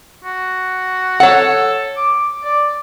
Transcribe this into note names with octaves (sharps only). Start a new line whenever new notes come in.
F#4
A4 C#5 F#5
D6
D5